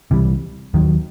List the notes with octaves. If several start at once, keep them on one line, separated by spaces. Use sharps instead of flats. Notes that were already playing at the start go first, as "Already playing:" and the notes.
C2 C3 E3 G3
D#2 D#3 F#3